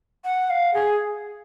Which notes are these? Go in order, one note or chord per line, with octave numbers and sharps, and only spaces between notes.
F#5
F5
G#4